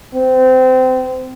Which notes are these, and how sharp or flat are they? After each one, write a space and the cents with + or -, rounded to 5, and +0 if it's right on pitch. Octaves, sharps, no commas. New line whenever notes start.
C4 -25